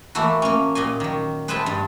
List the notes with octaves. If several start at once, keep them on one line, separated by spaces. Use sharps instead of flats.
E3 A3 A#3 E4 F#4
A#3 C#4
A#2 G4 D#5 G#5
D#3 F#3
G#4 B4 C5 E5 G5 A5
G2